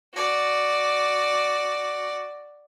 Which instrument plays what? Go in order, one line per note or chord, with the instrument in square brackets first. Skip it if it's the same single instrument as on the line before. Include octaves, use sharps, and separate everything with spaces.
[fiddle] F#4 D5